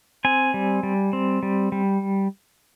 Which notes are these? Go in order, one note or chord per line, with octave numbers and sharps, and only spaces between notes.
C4 G#5
G3
G3
C4
G3
G3